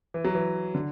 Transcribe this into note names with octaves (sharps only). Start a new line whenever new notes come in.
E3
F#3
E3
D3